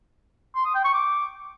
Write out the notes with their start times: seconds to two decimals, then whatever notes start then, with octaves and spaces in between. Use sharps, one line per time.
0.55 C6
0.65 D#6
0.75 G5
0.84 C#6
0.94 D6